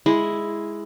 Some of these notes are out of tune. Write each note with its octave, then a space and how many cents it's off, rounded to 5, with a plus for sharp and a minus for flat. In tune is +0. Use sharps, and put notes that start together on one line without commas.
G#3 +0 E4 +0